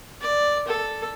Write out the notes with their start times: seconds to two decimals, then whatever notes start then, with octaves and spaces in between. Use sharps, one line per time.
0.21 D5
0.67 A4